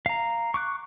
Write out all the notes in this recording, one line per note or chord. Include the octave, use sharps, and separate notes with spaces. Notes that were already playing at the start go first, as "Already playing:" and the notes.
F5 A#5
C#6 D6 F#6